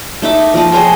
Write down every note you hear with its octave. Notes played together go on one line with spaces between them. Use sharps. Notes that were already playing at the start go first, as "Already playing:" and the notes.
A3 D#4 E5 D6
F3 D5 D#5
G#4 C5 C#5 G5